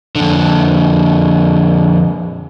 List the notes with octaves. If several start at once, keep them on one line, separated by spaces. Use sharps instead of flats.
F2 D3